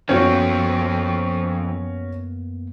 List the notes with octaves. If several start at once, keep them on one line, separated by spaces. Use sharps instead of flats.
F#2 F3 A#3 B3 C#4 F#4 A4 G5